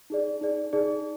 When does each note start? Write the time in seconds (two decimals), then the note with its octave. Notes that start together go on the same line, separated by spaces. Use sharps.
0.10 D#4 G#4 D5
0.41 D#4 G#4 D5
0.73 D#4 G#4 D5